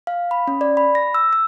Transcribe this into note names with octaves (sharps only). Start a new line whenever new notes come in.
F5
B5
C#4
D5
B5
A#6
E6
E6